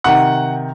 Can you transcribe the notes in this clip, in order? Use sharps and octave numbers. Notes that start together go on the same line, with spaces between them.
C3 D#3 F#5